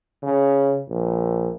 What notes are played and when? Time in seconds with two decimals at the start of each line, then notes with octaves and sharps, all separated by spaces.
0.23 C#3
0.88 A#1